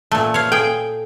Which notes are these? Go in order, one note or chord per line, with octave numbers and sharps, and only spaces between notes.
A#2 A3
C#5 F5
G#4 A4 G5